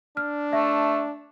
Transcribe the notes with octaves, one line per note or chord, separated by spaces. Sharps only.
D4 F6
A3 E5